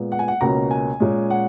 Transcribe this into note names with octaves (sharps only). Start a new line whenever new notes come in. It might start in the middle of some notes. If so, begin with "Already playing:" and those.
Already playing: A#2 G#3 B3
F#5
G#5
F#5
C#2 B2 A#3 C#4 A#5
G#5
A#2 G#3 C#4
F#5